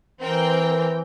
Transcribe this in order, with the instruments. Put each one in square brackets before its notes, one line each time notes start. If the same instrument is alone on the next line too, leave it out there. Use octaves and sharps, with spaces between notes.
[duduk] E3 [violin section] C4 A#4 G5